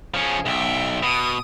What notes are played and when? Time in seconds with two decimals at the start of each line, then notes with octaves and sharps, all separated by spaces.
0.14 F3 C#4 G#4
0.46 B1 E5 G5
1.03 B2 D#6